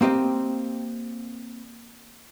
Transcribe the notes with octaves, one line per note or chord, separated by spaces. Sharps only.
A#3 C4 G4 D#5